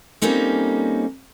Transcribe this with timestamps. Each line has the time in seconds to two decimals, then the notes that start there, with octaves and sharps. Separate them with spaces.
0.22 G3 A#3 C4 C#4 D#4 A4